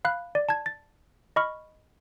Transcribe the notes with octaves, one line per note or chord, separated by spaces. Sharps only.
F5 B5 F#6
D5
A5 G#6
A6
D#5 B5 C#6 F6